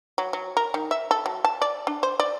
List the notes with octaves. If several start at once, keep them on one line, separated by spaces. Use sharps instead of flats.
F#3
F#3
A#4
D#3
E5
A4
F#3
A5
D5
D4
C5
D5